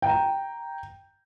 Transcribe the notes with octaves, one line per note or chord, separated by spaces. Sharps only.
G5 A#5